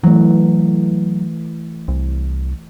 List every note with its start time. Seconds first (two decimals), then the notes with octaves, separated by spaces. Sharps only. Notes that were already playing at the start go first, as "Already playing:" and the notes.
0.04 E3 F#3 A3
1.88 C2